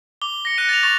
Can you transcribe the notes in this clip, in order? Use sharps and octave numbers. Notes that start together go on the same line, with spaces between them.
D6 G7
A#6 C#7
F#6 C#7 D#7
A6 F7
C#6 A6 F7